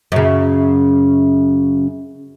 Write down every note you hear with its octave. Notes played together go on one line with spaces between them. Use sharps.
F#2 C#3